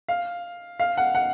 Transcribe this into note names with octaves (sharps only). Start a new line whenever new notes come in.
F5
F5
F#5
F#5